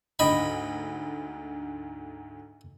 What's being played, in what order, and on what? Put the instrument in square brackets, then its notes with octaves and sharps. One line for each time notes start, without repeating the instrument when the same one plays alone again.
[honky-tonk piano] D2 G#2 D3 [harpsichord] D#5 G5 B5